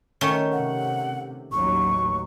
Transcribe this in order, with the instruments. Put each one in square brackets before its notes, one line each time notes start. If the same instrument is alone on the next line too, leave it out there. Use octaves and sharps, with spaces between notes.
[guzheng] D#3 A3 C#4
[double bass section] C3 [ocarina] F#5
[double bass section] A1 D#2 F#3 [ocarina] C#6